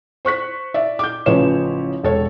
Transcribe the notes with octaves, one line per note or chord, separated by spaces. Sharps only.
C5 C#6 F#6 B6
D5 E5
D6 G6
A1 C#3 F3 B4 C#5 E7
E1 A4 C#5